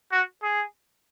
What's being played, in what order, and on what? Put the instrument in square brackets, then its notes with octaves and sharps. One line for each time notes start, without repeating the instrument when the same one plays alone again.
[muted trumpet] F#4
G#4